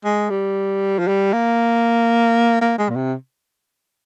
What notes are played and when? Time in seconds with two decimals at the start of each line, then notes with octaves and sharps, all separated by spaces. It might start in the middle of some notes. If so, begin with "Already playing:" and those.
0.05 G#3
0.30 G3
0.99 F3
1.08 G3
1.33 A#3
2.61 A#3
2.79 G#3
2.90 A#2
2.96 C3